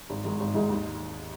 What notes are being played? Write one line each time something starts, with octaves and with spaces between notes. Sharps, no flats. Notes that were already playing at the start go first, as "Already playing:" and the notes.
G#1
G#2 D#3 G#3 D#4
G#1
G#2 D#3 G#3 D#4
D#2